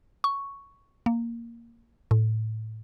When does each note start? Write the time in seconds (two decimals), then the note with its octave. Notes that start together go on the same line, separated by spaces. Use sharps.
0.24 C#6
1.06 A#3
2.11 A2